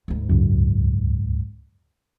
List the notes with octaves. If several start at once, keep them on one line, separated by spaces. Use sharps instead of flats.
D2 G#2
C#2 F#2